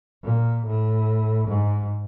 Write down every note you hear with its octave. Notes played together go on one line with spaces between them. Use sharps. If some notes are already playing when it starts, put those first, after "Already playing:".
A#2
A2
G#2